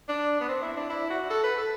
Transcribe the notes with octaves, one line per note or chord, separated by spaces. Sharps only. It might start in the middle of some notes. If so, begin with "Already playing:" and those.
D4
B3
C4
E4
D4
E4
F#4
A4
B4
A4